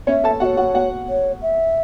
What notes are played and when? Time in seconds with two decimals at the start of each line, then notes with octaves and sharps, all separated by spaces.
0.07 C#4 C#5 E5
0.24 A4 A5
0.40 F#4 E5 F#5
0.44 C#5
0.57 F#4 F#5
0.74 F#4 F#5
1.08 C#5
1.42 E5